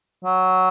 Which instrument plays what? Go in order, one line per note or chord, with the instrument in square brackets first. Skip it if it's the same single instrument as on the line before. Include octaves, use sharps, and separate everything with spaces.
[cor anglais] F#3